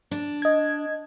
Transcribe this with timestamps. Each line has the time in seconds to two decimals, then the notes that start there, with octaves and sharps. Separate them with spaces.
0.11 D4
0.42 D#5 G#6